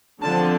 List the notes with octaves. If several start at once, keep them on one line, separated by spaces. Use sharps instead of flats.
D3 F3 C4 A5